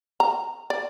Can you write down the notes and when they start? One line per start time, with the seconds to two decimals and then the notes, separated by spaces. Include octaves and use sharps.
0.20 A#5
0.70 D5